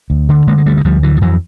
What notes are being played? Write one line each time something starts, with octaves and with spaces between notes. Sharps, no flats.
D2
D3
D3 G#3 A#3
G#3
D2 G3 A3
G#3
D2 F3 G3
D3 E3 F#3
F3
F2 E3 F#3